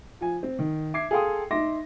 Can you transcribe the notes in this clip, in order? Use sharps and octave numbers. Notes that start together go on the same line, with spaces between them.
F3 G#5
C4
D#3
E5 D6 G#6 C7
G#4 A4 F5 G5 C6 D#6
D#4 E5 C6 D6 A#6